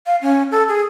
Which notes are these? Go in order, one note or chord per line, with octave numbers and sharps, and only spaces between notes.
F5
C#4
A4
G#4